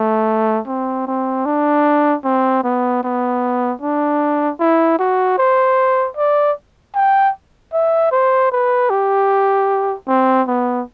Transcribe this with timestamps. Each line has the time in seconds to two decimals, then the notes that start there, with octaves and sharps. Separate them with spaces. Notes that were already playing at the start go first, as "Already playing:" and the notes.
Already playing: A3
0.67 C4
1.07 C4
1.45 D4
2.24 C4
2.64 B3
3.03 B3
3.81 D4
4.60 E4
4.99 F#4
5.38 C5
6.17 D5
6.95 G5
7.73 E5
8.12 C5
8.52 B4
8.90 G4
10.07 C4
10.47 B3